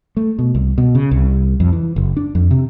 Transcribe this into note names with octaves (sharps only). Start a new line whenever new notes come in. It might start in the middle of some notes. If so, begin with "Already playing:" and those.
A3
B2
C2
B2
C#3
C2
F2
E3
F#1
D4
F2
C3